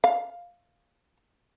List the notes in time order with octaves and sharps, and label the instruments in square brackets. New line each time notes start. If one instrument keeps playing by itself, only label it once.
[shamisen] F5